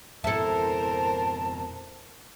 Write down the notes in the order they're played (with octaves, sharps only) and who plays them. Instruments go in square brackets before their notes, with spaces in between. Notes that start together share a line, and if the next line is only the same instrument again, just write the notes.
[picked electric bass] F2 B2 [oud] E4 A4 [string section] A#4 C5 [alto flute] A5